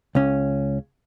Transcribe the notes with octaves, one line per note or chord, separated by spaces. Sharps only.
C#2 C#4